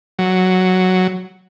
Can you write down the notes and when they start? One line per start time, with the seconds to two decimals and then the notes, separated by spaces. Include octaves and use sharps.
0.19 F#3